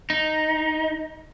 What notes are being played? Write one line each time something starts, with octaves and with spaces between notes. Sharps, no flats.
D#4